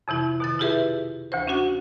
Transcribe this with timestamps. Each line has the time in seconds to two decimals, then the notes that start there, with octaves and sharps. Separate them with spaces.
0.08 F2 C3 E3 E4
0.40 B2 D#3 A6
0.59 E4 F4 G4 G#4 B4 E5
1.32 D2 E3 C5
1.47 C#4 D4 F#4 F#5